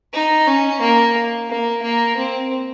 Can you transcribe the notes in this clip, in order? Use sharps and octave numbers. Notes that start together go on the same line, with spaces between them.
D#4
C#4
A#3
A#3
A#3
C4